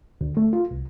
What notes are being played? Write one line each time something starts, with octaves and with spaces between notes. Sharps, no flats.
D2
A3
F4
C2